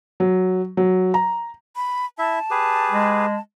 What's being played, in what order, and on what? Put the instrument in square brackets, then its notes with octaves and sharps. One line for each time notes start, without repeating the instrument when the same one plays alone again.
[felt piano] F#3
F#3
A#5
[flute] B5
[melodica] E4 E5 [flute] A5
[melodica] G4 G#4 B4
[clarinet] G#3